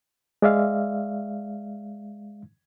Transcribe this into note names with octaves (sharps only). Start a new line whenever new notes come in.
G#3 D5 E5 F5